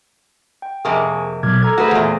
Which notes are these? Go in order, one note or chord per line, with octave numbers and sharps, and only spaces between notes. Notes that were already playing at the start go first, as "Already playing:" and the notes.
G5
F2 C3 A#3 G#4 G#5 C#6
B2 F#3 D6 F6 G#6
A4 A#5 G#6
A3 F#4 G#4 B4 C5
E2 A#2